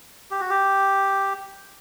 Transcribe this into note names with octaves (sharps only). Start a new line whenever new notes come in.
G4
F#4
G4